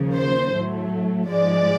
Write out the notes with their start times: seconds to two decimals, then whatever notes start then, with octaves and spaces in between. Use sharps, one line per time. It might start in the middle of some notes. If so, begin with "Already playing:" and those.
Already playing: D#2 C#3 F3 A#3
0.16 C5
0.53 A2 F#3 A3
1.29 G#2 F3 G#3 D5